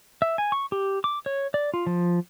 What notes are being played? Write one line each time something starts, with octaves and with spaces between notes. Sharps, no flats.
E5
G#5
C#6
G4
D6
C#5
D5
F4
F3